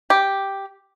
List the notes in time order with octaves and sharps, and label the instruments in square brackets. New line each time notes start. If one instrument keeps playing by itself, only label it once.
[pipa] G4